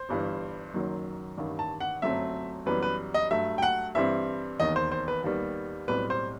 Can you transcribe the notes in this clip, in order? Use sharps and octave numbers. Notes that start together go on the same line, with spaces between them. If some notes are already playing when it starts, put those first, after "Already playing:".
Already playing: C5
G1 G2 E3 G3
F#1 F#2 D#3 F#3
A1 G2 D#3
A5
F#5
G1 F#2 F#3 A3 C4 E5
F#2 E3 G3 B3 B4
B4
D#5
G2 F#3 A3 E5
G5
F#5
G2 E3 G3 C4 E5
E1 D#2 D#3 D#5
C5
C5
B4
D#2 D#3 G3 B3
B1 A2 G3 C4 B4
C5